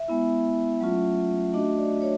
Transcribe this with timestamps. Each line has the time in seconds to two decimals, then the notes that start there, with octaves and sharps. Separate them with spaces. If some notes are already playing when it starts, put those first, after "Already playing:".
Already playing: E5
0.08 G#3 B3 E4
0.81 F#3 A3 C#4 F4
1.53 A3 D4 F#4 D#5
1.78 D5
2.02 C#5